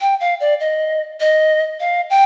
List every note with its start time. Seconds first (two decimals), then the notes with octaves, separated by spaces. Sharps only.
0.01 G5
0.21 F5
0.40 D5
0.60 D#5
1.20 D#5
1.80 F5
2.10 G5